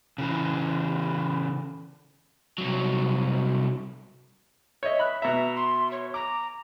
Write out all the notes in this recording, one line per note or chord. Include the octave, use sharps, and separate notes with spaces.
C#3 E3
C2 F#3
C#5 D#5 E5
B5 F#6
B2 E5 A#5
C6
C#5
A#5 D6